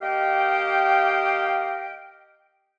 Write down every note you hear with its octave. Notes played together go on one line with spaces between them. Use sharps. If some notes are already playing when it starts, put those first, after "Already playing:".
A#3 G4 D#5 F5 G5